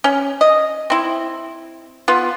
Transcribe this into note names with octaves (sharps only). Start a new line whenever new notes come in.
C#4
D#5
C4 E4
B3 F4